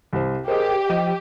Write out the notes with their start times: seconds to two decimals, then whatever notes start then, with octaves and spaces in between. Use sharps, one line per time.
0.13 C2 C5
0.48 G4 G#4 A#4 C5 D#5
0.90 F3 D#5